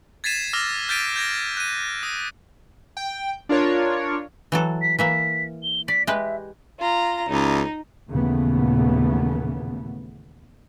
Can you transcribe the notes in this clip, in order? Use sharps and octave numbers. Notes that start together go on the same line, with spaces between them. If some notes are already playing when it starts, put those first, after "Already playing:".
G#6 A6 B6 C7 D#7 E7
D6 E6 F6 A#6
F6 G6 A6 B6 D7 D#7
G6 G#6 A#6 D7
F#6 D#7
D#6 A#6
G5
D4 F4 A#4 C#5
E3 F#3 A4
B6
E3 A#3 E5 B6
G7
D5 B6
G#3 G4 B4 E5
F4 A#5
C#2 D#4
D#2 A#2 C#3 E3 A3 B3